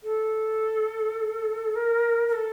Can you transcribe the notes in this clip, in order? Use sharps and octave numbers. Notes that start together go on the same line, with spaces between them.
A4
A#4
A#4
A4